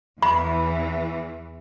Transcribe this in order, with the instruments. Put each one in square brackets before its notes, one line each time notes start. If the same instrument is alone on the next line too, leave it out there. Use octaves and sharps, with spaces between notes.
[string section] E2 E3 [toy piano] B5